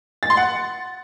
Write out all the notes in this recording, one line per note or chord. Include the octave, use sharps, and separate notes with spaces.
A6
C6
F#5